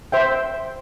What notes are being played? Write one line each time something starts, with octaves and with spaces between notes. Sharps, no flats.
C5 E5 G5